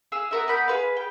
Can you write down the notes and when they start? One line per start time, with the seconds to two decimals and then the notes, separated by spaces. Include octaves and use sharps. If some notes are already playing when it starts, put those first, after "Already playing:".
0.12 G#4 F5 E6
0.31 B3 A#4 E5
0.48 B3 A#4 B5 G6
0.68 G#4 B4 F5
0.97 G5